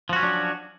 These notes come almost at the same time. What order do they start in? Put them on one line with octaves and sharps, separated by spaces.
F3 F#4 C#4 F#3 D4